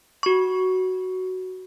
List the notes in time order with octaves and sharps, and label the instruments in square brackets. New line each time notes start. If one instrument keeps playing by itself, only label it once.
[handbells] F#4 C#6